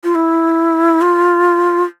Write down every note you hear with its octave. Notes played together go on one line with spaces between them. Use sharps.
F4
E4
F4